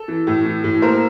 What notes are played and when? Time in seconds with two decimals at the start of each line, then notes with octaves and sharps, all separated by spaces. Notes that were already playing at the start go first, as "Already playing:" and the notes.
Already playing: A4
0.08 E3
0.27 A2
0.45 E3
0.64 A2
0.82 A#3 A#4 C5